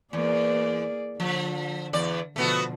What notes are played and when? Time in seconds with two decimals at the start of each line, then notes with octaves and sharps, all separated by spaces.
0.13 E2 A#3 G#4 D5
1.20 D3 F3
1.93 E2 D5
2.36 B2 D3 F3 A3 B3 F#4